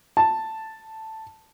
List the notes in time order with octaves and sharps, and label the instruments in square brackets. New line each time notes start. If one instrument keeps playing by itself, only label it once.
[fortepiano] A5